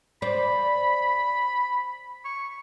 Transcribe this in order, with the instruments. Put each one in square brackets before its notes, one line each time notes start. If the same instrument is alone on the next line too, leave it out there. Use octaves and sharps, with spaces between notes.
[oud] C5 D5 [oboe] B5
[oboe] C#6